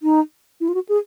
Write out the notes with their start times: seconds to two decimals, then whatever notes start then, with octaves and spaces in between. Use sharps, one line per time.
0.03 D#4
0.60 E4
0.69 F4
0.74 F#4
0.89 G#4